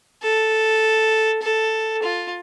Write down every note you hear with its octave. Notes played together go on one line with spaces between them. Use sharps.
A4
A4
F4